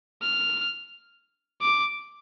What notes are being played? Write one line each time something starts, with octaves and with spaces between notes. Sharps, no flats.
F6
D6